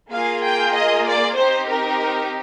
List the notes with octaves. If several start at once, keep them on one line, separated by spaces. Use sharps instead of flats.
A#3 F4 G#4 F5
G5
D#5
D5
C4 D#4 G4 C5
A#4